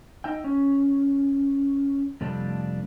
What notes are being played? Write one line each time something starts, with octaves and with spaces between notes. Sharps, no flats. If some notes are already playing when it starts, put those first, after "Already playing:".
D#4 E5 G5
C#4
F2 C3 G3 A3 D4